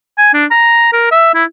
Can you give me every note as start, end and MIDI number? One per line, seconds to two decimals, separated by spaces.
0.18 0.29 80
0.34 0.45 62
0.51 0.90 82
0.93 1.09 70
1.11 1.34 76
1.35 1.44 64